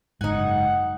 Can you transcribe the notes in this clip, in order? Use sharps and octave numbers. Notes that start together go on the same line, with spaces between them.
F#1 G#2 D#4 F#5 G#5